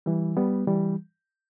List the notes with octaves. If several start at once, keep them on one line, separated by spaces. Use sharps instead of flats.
E3 G3
G3 B3
E3 G3